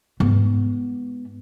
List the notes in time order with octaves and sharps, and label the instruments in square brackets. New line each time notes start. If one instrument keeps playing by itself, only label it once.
[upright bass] G#2 B3